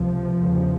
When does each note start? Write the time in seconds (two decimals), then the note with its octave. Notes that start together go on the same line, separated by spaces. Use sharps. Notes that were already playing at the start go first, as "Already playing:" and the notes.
Already playing: C#2 C3 F3
0.40 E2 C#3